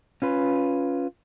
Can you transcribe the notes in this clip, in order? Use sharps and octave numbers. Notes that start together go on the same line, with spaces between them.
C#4 F4 B4